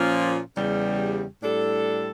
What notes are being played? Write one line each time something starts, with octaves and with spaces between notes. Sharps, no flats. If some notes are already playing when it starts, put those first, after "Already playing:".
Already playing: A#2 F3 A#3 C#4 F4
E2 C#3 G3
A2 G3 D4 A4